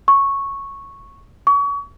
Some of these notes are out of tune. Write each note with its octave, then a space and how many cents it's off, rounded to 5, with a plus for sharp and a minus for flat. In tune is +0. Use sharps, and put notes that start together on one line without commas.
C#6 -5
C#6 +35